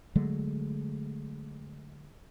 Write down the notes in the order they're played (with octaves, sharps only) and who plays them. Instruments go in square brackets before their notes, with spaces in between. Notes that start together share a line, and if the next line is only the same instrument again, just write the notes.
[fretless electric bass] D3 F#3 G#3 A3